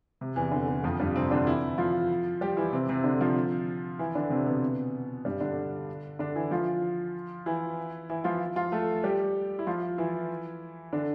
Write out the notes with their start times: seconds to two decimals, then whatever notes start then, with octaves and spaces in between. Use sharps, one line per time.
0.21 C3
0.36 E2 E3
0.52 D3
0.68 D3
0.84 F2 F3
1.00 G2 G3
1.16 C3 C4
1.31 D3 D4
1.47 E3 E4
1.78 F3 F4
2.41 G3 G4
2.57 E3 E4
2.73 C3 C4
2.89 C3 C4
3.04 D3 D4
3.21 F3 F4
3.99 E3 E4
4.15 D3 D4
4.30 C3 C4
4.46 B2 B3
5.25 G2 G3
5.41 D3 D4
6.19 D3 D4
6.35 E3 E4
6.51 F3 F4
7.46 E3 E4
8.10 E3 E4
8.24 F3 F4
8.56 F3 F4
8.72 A3 A4
9.04 G3 G4
9.59 E4
9.67 F3 F4
9.98 E3 E4
10.93 D3 D4